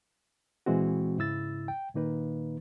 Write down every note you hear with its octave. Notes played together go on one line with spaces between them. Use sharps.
A#2 E3 G#3 C4 F#4
G#2 C#3 E4 E6 A6
G5
A#2 D#3 A#3 D#4 B4